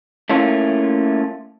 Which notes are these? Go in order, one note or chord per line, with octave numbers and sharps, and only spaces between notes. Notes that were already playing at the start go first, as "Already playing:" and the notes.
A3 A#3 C#4 E4 F4